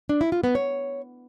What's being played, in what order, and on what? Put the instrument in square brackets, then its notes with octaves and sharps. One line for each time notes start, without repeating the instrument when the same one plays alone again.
[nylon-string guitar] D4
E4
F4
B3
C#5